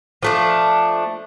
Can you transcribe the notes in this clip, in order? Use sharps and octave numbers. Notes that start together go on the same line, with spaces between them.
F3 A3 D4